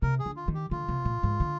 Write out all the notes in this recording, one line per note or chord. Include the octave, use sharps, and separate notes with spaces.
C3 A#4
G#4
D3
F4
D#3
G4
D3 F4
C3
A#2
G#2
D3